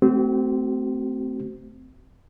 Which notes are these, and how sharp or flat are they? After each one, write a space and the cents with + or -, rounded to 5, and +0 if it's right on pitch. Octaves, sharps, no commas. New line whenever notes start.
A3 +0 C4 -15 F#4 +40